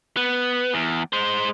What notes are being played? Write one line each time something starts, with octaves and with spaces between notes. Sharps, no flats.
B3
E2
G#3 C5